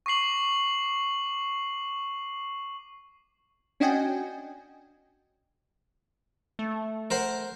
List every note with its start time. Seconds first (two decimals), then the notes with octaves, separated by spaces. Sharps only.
0.06 C#6 D6 C7 F#7
3.80 C#4 D4 F#4 D#5 G5 G#5
6.59 A3
7.10 A#4 C5 F#5